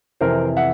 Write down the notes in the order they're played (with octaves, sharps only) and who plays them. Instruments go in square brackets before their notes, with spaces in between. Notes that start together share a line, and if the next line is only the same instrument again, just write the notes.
[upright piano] F2 C3 E3 A#4 C5
E5 F#5